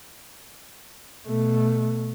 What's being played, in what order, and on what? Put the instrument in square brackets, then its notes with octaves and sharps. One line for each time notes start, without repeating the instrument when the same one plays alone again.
[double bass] B2 A3